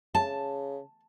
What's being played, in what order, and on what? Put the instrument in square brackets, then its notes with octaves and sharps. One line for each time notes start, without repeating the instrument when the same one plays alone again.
[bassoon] C#3 [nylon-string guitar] A5